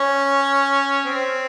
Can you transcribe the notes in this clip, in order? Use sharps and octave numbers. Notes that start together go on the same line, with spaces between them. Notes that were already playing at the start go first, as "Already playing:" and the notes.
Already playing: C#4
C4